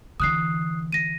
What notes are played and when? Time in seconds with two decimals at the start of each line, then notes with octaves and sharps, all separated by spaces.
0.20 D3 E3 D#6 F#6 C7
0.92 A#6 D#7